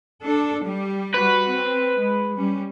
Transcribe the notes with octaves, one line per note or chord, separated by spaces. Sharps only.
D4 A4
G3
G3 F#4 B4
C4
G#3
G3 C#4